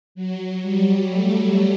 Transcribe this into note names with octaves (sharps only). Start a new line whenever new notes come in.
F#3
G3
A3